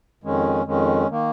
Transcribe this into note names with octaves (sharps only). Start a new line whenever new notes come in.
F2 D#3 G#3 C#4
F2 D#3 G#3 C#4
D#3 A#3